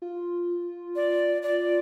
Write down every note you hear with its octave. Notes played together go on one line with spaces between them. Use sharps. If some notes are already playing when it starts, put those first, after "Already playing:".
F4
D5
D5